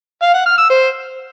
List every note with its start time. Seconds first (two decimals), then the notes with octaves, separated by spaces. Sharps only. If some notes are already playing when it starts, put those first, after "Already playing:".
0.22 F5
0.34 F#5
0.46 F6
0.58 E6
0.70 C5